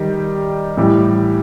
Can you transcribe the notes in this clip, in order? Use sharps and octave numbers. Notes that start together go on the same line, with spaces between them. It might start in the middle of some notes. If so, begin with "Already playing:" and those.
Already playing: D#3 G3 D#4 G4
A2 E3 G3